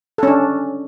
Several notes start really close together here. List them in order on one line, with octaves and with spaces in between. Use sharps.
A4 C#4 D4